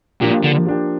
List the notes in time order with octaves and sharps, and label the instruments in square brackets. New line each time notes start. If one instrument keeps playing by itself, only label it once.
[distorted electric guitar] A#2 [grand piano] F3 A#3 D4 G4
[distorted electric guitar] D3
[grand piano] F3 A#3 D4 G4